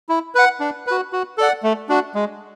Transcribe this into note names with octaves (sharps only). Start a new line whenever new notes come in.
E4
B4 F#5
D4
F#4 B4
F#4
A4 D5 F#5
A3
D4 F#4
G#3